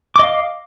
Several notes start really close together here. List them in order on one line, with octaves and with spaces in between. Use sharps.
D6 D#5 F5